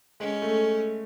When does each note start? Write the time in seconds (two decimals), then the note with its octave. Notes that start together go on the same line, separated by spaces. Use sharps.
0.20 G#3 C#4
0.42 A3